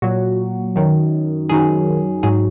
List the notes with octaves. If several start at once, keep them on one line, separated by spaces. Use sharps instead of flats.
A#2 F#3 F#4
F#2 D#3 F#3
F#2 D#3 F#3 G#4
G#2 F#3 G#4